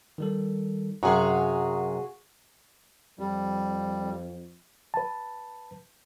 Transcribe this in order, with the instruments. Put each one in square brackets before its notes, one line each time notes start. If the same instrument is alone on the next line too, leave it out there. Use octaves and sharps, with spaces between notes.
[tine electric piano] D#3 G3 A4
[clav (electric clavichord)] F#2 C3 [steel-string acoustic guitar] F#4 G#4 F5 [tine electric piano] A#5 C#6 D#6
[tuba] F2 [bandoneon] G3
[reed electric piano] B4 A5